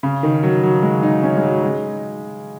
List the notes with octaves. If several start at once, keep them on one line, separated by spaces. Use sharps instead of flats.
C#3
D#3
F#3
F#3
G#3
D#4
C#4
G#3
F#3
G#3